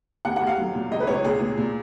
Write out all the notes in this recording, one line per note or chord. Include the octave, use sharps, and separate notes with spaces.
D#2 F#5
F#5
D#2 F5
F#3
A#2
C#2 D#5
B4
C#2 C#5
A#2 G#4
A#2
A#2